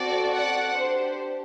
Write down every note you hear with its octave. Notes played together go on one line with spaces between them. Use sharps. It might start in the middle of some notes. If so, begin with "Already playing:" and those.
Already playing: C4 F#4 A4 D5
D5 F#5
D4 G4 C5